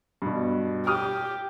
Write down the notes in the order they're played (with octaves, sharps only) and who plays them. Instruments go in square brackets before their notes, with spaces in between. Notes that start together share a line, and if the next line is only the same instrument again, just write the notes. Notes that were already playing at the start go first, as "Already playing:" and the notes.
[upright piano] G2 B2
[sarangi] G4 [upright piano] D#6 F6